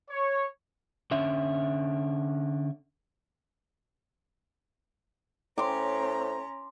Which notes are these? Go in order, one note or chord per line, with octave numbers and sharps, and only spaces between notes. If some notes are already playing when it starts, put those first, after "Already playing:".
C#5
D3 C#4 E5
A2 C#4 C5 A#5 C6 D6